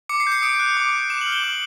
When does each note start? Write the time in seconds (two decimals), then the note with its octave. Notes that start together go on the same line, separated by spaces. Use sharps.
0.09 D6 C#7
0.20 C7
0.27 G6
0.32 C#7
0.42 D#6 D7
0.60 F#6
0.77 D6
0.93 G6
1.10 D6 E7
1.21 F#7
1.27 F6
1.32 G7
1.44 D6 F#7